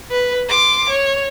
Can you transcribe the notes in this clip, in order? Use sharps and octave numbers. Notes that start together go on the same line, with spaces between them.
B4
C6 D6
C#5